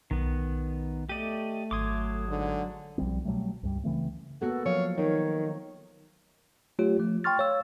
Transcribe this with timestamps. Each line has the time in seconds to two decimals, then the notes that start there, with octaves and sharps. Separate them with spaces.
0.11 B1 D#3 B3
1.09 A3 G4 D5 D#5 D#7
1.71 G#1 F#3 C6 D6 D#6 G#6
2.29 G#2 D3
2.98 B1 F3 G3 C4
3.25 B2 F#3 G3 A3
3.63 C#2 G2 G3
3.84 C#3 E3 A3 C4
4.42 A#3 B3 F#4 A4
4.65 F3 F#3 C#5 F5
4.98 D#3 C#5
6.79 F#3 A3 F4 G4 C#5
6.99 F3 A3
7.24 G5 C6 C#6 F6 A6
7.39 C#5 F5 E6